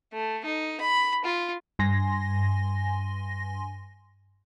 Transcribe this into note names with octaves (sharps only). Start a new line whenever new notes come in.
A3
D#4
B5
F4
G2 G#5 C6 A#6